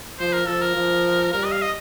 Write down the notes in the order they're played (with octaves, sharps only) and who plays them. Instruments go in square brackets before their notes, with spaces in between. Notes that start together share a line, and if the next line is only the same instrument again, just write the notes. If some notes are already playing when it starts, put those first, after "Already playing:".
[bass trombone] F3 [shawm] C5
[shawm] A#4
[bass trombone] F3 [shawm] A4
[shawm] A#4
[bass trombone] F3
[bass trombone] G3 [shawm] A#4
[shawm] D#5
F5
D#5